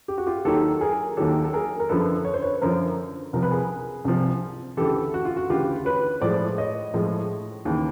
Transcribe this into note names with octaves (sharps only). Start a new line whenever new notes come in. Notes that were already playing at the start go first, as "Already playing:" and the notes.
G4
F#4
F4 G4
D#2 D#3 F#3 G4 A4
G#4 A#4
D#2 D#3 F#3 G4 A4
A4
G#4 A#4
A#4
F#2 D3 F3 A4 B4
C#5
C5
B4 C#5
F#2 D3 F3 A#4 C5
C2 C3 F3 A#4
B4
G#4 A#4
C2 C3 F3
D2 C#3 E3 G4 A4
F#4
F4
F#4
D2 C#3 E3 F4 G4
B4 C#5
A2 F3 G#3 C5 D5
C#5 D#5
A2 F3 G#3
D#2 C#3 E3